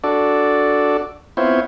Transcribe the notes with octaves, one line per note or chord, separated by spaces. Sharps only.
D4 F#4 A4 D5
B3 C4 E4 F4 C5 C#5